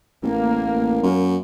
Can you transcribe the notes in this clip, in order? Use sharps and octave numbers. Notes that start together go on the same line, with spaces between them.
A1 A#3
F#2